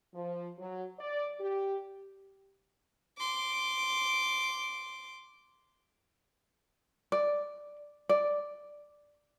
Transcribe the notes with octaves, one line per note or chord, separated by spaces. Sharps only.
F3
F#3
D5
G4
C6 D6
D5
D5